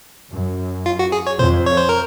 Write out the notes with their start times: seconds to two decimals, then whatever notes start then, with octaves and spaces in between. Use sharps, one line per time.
0.32 F#2
0.86 F4
0.99 F#4
1.12 G#4
1.27 C#5
1.39 F2 C5
1.66 C#5
1.77 C5
1.89 A#4